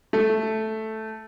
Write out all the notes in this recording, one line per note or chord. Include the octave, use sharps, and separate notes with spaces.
A3